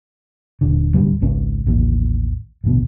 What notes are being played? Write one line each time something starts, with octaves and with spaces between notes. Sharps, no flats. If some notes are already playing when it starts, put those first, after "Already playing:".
D#1 D3
D1 C2 D3 G3
G#1 C#2 C#4
A1 D#2
A1 D2 B2